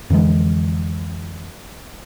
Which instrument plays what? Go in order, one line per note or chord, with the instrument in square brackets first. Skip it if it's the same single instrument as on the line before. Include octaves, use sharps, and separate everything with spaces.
[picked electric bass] F2 D3 E3 G#3